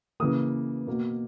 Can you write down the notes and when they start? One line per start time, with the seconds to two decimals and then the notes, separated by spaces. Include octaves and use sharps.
0.20 C#3 E3 A#3 D#6
0.87 B2 A#3